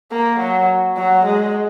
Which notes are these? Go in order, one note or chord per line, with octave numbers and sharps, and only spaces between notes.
A#3
F#3
F#3
G#3